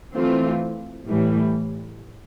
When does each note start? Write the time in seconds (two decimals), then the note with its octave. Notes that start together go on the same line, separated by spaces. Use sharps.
0.15 E3 A3 C4 F4
1.07 A2 E3 G3